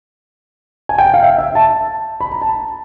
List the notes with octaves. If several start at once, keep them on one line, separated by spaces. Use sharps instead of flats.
G#5
G5
F#5
F5
E5
E5
A5
B5
A#5
A5